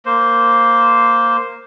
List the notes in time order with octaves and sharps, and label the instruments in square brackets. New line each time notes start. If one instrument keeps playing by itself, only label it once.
[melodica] A#3 C5